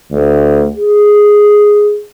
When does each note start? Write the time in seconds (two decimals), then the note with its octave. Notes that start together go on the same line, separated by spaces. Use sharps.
0.12 D2
0.77 G#4